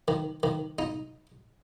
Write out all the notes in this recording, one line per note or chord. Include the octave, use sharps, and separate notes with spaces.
D#3
D#3
D#4